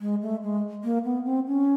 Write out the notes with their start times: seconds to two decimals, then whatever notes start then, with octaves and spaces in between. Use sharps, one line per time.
0.01 G#3
0.22 A3
0.43 G#3
0.84 A#3
1.04 B3
1.25 C4
1.47 C#4